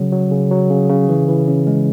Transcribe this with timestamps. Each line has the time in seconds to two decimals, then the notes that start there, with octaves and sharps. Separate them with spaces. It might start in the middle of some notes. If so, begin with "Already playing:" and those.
Already playing: C#3 F#3 C#4
0.12 F#3
0.31 C#3
0.51 F#3
0.70 C#3
0.90 C#3
1.09 E3
1.29 E3
1.48 C#4
1.67 G#3